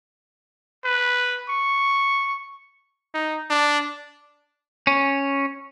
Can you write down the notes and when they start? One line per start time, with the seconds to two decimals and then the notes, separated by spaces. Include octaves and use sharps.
0.85 B4
1.49 C#6
3.14 D#4
3.50 D4
4.87 C#4